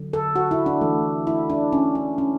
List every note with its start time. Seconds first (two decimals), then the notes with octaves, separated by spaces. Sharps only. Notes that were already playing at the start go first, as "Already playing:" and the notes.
Already playing: D3 F#3
0.13 A4
0.36 F#4
0.51 E4
0.66 D4
0.81 E3 A3
1.27 E4
1.50 D4
1.72 C#4
1.95 D4
2.18 C#4